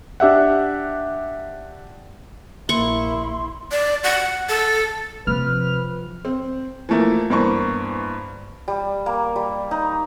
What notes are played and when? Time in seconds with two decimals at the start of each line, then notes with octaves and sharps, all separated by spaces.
0.20 D4 G4 E5 F#5
2.69 A#1 A#3 E4 C6 C#6
3.72 D5
4.04 F#5
4.49 A4
5.27 C3 F3 B4 F6
6.25 C4
6.89 E3 F3 A3 A#3
7.30 G2 E3 A#3 B3 C5 C#6
8.68 G3
9.06 A#3
9.36 G3
9.71 D#4